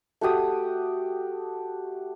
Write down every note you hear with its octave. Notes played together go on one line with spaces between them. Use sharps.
A3 F#4 G4 D#6